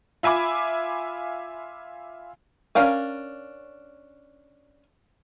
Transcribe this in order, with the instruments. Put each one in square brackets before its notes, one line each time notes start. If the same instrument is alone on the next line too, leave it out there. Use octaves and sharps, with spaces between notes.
[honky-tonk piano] F4 E5 G#5 B5 D6
[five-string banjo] C#4 D4 A#4 F5 G#5